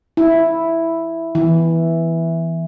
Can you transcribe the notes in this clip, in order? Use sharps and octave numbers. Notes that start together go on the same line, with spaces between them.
E4
E3